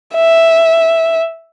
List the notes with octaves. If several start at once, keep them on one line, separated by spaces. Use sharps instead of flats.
E5